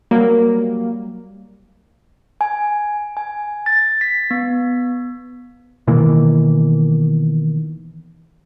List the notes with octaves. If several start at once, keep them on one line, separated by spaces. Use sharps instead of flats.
F#3 G3 A#3
G#5
G#5
A6
B6
B3
B2 D#3 E3 A#3